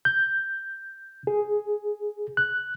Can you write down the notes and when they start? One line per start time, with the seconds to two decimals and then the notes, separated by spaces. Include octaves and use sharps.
0.05 G6
1.27 G#4
2.37 F#6